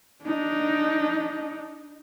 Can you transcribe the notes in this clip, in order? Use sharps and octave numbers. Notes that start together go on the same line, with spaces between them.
D4 D#4